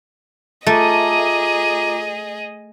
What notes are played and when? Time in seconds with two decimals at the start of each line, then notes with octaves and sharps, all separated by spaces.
0.66 A3 F4 G#4 D#5 A#5 D6